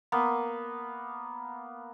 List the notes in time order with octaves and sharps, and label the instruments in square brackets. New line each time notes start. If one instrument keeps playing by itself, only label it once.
[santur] A#3 B3